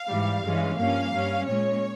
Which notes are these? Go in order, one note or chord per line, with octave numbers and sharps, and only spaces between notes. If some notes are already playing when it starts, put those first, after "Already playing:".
Already playing: F5
G#2 E3 G3
G2 E3 G#3 C#4
G2 F3 A#3 C#4 F5
G2 G3 C#4
A#2 G#3 C#4 C#5